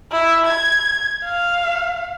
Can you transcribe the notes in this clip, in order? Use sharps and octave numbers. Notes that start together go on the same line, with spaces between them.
E4
G#6
F5